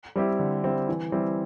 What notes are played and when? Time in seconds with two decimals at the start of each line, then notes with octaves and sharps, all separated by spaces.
0.16 G3 C4 E4 G4
0.39 D3
0.64 G3 C4 E4 G4
0.88 E3
1.12 G3 C4 E4